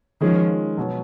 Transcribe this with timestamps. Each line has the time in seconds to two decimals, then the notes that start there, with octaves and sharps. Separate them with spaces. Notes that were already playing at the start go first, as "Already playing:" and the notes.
0.21 D#3 F3 G#3 C#4
0.77 B2 F#3